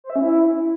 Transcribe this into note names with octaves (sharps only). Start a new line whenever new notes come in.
C5
E5
C#4
E4